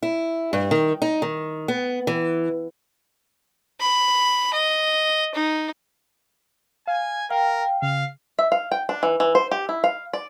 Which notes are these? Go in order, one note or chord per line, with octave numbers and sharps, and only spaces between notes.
E4
G2
D#3
D#4
D#3
B3
E3
B5
D#5
D#4
F5 G#5
A#4 F5 G5
C#3 F5
E5
F5
G5
D4
E3
E3
C5
G4
E4
F5
D5